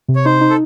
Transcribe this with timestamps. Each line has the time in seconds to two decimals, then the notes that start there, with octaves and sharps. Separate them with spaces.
0.08 C3
0.16 C#5
0.25 D#4 C5
0.41 D#4
0.50 A4